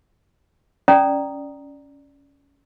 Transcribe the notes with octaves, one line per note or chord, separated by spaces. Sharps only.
C#4 D5 A#5 D#6